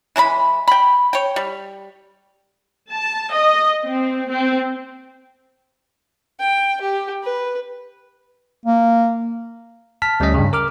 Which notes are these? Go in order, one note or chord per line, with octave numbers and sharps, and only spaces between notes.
E3 G#3 A#5 B5
G5 B5
C#5 G5
G3
A5
D#5
C4
C4
G5
G4
B4
A#3
A5 F6 B6
D2 G3 A3 C#4 D#5 B6
G2 C#3
A#4 D6 F6